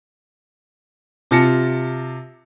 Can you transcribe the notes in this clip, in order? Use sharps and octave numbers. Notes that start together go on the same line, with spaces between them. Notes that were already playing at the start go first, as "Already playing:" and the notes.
C3 F4 A5 A#6 C#7